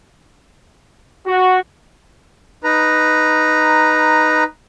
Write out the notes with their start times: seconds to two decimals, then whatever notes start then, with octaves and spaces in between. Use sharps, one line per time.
1.27 F#4
2.64 D#4 B4 A#5